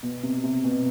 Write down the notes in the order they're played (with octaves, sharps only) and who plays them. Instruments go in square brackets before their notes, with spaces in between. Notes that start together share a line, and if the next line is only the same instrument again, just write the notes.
[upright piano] B2
C3
C3
B2